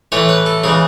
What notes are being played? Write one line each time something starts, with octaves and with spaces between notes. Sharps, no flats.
A2 E3 A3 C#5
B4
A4
C#3 E3 G#3 G#4